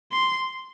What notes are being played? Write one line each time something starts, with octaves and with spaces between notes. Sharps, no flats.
C6